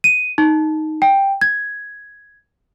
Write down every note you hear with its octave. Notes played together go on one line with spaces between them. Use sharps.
D#7
D#4
G5
G#6